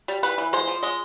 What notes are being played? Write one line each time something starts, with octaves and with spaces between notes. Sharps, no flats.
G3
E3 B4
E3
G#3 C5
F3
G#3 D#5